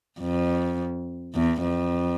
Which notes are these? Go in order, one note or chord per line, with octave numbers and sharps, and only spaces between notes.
F2
E2
F2